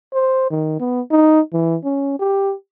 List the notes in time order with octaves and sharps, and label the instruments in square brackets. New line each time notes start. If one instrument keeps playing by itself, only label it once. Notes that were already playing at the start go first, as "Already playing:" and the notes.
[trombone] C5
D#3
B3
D#4
E3
C#4
G4